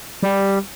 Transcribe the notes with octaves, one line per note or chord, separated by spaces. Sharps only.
G3